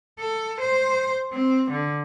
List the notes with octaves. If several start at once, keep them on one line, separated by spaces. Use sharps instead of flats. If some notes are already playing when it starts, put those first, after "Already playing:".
A4
C5
C4
D3